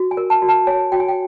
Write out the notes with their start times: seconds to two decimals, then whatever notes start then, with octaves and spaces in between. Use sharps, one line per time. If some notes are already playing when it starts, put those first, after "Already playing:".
Already playing: F#4
0.11 G#5
0.17 A#4
0.30 A5
0.42 F#4
0.48 A5
0.67 C#5 G#5
0.92 F#4 G5
1.00 G#5
1.08 G5